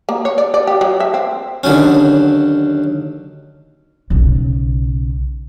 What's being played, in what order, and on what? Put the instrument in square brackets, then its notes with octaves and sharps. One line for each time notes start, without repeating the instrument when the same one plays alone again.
[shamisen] A#3
C#5
D5
D5
G4
F#3
E5
C4
[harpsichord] D#2 D3 F#3 C#4
[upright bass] B1 C#3